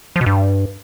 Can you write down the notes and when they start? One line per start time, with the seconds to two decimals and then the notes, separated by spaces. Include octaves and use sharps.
0.16 F3
0.21 B2
0.26 G2